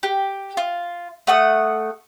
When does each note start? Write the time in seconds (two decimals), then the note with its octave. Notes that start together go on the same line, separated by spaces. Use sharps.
0.03 G4
0.57 F4
1.27 A3 F#5 D#6